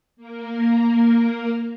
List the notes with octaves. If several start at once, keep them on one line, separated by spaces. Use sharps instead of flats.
A#3 A#4